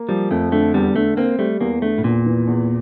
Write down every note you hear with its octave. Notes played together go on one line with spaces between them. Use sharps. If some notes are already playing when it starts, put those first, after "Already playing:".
Already playing: A#3
F3 G3
F2 A3
D3 A3
E2 G3
D3 A3
A#3 C4
G3 A3
E2 A#3
D3 A3
A2
E2 A#2
E3
E2